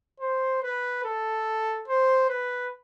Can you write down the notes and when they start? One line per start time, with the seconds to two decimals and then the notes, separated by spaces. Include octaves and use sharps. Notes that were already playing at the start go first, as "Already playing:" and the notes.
0.20 C5
0.62 B4
1.05 A4
1.88 C5
2.29 B4